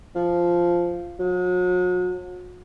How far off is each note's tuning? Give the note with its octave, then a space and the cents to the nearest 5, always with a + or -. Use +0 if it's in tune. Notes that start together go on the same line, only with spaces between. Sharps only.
F3 -5
F#3 -40